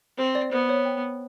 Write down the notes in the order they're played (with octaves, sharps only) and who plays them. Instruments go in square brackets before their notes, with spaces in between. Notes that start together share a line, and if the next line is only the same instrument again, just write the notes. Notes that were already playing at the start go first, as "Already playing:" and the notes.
[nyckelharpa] C4 [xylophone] C5
[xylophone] D5
[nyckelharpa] B3 [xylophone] C5
[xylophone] C#5
G5